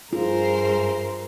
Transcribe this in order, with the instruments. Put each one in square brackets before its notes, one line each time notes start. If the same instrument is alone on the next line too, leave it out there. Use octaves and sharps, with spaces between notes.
[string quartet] G2 A#4 C5 [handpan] F4 [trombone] G#4